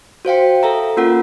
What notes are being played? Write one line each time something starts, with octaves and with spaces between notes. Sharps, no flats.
F#4 C5 F5 G5
A4 E5 A#5
A#3 C#4 F4 A#4 F#5